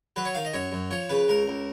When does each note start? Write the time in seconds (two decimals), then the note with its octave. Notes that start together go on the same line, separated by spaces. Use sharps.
0.16 F#3 B4
0.25 C#5
0.35 D#3 F5
0.45 D#5
0.54 F#2 C#5
0.72 F#2
0.91 F3 C#5
1.09 C#3 B4
1.28 C#2 A#4
1.48 C#2